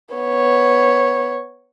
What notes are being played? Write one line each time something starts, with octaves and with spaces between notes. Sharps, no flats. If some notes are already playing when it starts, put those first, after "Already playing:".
B3 C#5